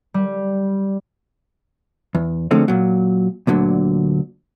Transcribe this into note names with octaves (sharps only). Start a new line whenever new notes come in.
G3
E2
D3 F3 G#3 A3 C4 C#4
A#2 F#3
D2 A#2 D3 F#3